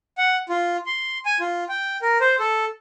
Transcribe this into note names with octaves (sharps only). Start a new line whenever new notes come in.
F#5
F4
C6
G#5
F4
G5
A#4
C5
A4